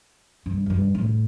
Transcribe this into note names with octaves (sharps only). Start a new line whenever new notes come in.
G2
F2
G2
A2